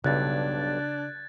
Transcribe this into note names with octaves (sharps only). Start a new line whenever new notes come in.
B1 G2 C#3 D4 F#6 G#6 A6